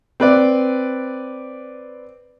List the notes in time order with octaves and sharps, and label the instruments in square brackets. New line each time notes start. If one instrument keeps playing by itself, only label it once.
[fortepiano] C4 B4 D5